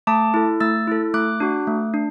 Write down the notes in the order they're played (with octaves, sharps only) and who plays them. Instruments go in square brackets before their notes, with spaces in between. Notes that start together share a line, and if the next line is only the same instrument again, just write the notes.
[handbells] A3 A5 D6
E4 A4
A3 E6 A6
E4 A4
A3 D6 F#6
D4 F#4
A3
D4